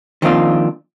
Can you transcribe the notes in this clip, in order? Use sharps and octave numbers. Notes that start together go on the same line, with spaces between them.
D#3 F3 A#3 C4 D4 F4